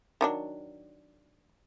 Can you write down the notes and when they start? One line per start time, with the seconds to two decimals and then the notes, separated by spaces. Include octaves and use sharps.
0.21 D#3 F#3 D4